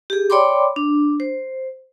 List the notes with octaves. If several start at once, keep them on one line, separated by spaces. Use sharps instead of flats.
G4 G#4
C#5 D5 G5 B5 C6 D6
D4
C5